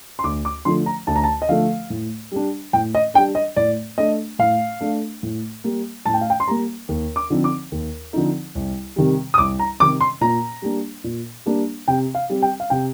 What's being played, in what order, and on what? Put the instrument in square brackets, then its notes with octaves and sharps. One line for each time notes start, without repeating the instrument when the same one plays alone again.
[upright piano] C6
[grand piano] D2 [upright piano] D6
[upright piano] D6
[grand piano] D3 F3 A3 [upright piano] C6
[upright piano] A#5
[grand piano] D2 [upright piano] A5
[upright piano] A#5
A5
D#5
[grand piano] D3 F3 A3 [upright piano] F5
[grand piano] A2
G3 D4
[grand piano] A2 [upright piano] G5
[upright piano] D#5
[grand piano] G3 D4 [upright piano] G5
[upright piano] D#5
[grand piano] A2 [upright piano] D5
[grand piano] A3 D4 [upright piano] D#5
[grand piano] A2 [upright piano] F5
[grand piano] A3 D4
A2
G3 A#3
[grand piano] A2 [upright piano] A5
[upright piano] G5
F5
G5
C6
[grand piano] G3 A#3 [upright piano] A#5
[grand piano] D#2
[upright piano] D6
[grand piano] D3 F3 C4 D#4
[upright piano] D6
[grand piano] D#2
D3 F3 C4 D#4
C2
C3 D#3 G3
[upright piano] D#6
[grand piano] C2 [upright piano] D6
[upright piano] A#5
[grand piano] C3 D#3 G3 [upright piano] D6
[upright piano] C6
[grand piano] A#2 [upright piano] A#5
[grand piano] G3 A#3 D4
A#2
G3 A#3 D4
[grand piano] C3 [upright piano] G5
[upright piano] F5
[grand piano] G3 C4
[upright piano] G5
F5
[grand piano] C3 [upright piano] G5